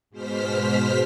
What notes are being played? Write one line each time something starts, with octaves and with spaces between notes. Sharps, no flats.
G#2 B2 C5 F6 B6